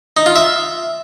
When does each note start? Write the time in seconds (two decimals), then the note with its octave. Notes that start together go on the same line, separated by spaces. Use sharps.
0.17 D#4
0.26 F4
0.36 E5